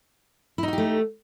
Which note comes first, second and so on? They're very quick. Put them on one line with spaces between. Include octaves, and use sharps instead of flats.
E4 D#4 F#4 G4 A3